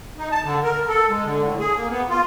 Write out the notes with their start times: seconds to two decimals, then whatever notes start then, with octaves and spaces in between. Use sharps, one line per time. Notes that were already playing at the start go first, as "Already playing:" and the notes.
0.18 D#4
0.31 A5
0.44 D3
0.63 A#4
0.88 A4
1.09 G#3
1.24 D3
1.43 A2
1.59 G#4
1.76 A#3
1.90 B3
2.09 F4